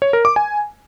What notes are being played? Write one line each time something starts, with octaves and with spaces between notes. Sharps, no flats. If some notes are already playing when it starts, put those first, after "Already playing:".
C#5
A#4
D6
G#5